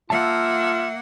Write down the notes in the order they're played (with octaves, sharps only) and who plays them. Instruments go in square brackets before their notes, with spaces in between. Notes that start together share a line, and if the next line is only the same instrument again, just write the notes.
[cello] A#3 F#5 [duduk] F4 [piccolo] E5 [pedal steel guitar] A5 E6